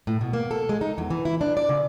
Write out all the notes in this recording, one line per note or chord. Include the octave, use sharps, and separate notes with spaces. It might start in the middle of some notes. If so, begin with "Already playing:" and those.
A2
B2
A#3
A4
G#3
D#4
E2
E3
E4
D4
D5
C#3